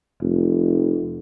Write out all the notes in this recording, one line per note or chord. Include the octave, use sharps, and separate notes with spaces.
F1